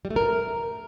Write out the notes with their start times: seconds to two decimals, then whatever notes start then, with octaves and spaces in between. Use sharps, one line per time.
0.05 G3
0.10 A3
0.16 A#4